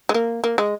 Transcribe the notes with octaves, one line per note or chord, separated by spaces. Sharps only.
G#3
A#3
A#3
G#3